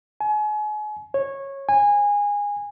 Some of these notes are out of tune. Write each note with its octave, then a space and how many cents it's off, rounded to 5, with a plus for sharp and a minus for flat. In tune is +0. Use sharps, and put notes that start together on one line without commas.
G#5 +35
C#5 -15
G#5 -20